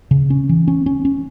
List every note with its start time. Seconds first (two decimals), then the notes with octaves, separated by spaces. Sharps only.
0.11 C#3
0.30 C#4
0.49 E3
0.68 C#4
0.86 C#4
1.05 C#4